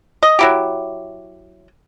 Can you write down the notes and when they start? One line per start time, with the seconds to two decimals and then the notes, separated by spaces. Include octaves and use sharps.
0.23 D#5
0.39 F#3 E4 G4